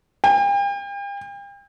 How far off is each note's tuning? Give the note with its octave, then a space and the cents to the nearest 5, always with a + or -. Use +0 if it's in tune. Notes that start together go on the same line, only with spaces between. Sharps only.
G5 +40